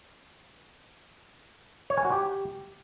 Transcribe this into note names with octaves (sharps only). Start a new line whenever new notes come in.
C#5
G#5
F#4
G4